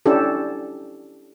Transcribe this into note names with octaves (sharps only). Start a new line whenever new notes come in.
C#4 D4 E4 G4 A4